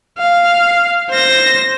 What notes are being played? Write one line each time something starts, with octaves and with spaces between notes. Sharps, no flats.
F5
C5 A#6